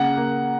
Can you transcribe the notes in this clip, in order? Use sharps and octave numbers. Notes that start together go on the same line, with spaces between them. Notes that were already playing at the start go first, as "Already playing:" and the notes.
Already playing: C#3 A#3 F#5
A#3